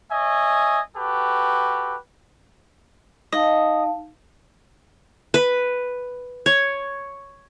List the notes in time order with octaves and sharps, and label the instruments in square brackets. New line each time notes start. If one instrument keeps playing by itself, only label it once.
[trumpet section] C#5 D#5 E5 G#5
F#4 G4 A4 B4
[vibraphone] D#4 F5 A5 [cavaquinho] D#5
[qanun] B4
C#5